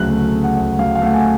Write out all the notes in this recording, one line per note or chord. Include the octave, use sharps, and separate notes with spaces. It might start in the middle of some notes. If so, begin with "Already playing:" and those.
Already playing: D2 C#3 F#3 F#6
A3
C#3
F#5
D2
F#3 F5
F5
A3 F#5
G#5